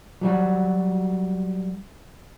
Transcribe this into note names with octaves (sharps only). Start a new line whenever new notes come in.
F#3 G3 F#4